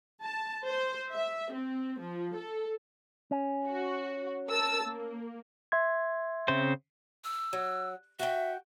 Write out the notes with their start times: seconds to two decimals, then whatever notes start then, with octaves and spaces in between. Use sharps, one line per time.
0.23 A5
0.66 C5
1.12 E5
1.54 C4
2.01 F3
2.36 A4
3.31 C#4
3.67 F#4
4.49 A#4 A5 E6
4.84 A#3
5.72 E5 C6 G#6
6.48 C#3 C4 C5
7.24 E6
7.53 F#3
8.19 F#4 E5 G5